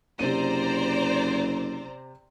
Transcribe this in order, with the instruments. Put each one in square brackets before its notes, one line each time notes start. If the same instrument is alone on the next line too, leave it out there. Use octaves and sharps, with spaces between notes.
[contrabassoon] F#1 [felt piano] C3 D#7 [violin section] C5 D5 A#5